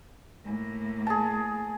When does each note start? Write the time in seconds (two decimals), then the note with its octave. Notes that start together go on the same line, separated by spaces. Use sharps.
0.45 A2 A#3
1.07 G#4 A5